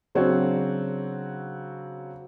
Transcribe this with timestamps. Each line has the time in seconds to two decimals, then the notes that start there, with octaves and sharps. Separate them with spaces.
0.15 C#3 F#3 C4 D4 F#4 C#5